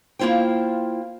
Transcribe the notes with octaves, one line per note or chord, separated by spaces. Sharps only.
A#3 E4 F4 C5 G5